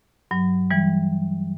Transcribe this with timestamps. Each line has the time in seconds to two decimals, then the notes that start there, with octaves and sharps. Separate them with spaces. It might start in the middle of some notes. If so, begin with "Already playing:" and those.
0.31 G2 F#3
0.71 E3 G3